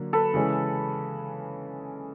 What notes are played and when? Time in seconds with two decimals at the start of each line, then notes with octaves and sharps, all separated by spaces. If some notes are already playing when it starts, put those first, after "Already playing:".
Already playing: D3 F#3 A#3
0.13 A4 B4
0.34 C#3 E3 G#3 C#4